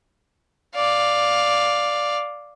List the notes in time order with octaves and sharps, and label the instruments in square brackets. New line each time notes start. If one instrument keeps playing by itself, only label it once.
[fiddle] D5 F5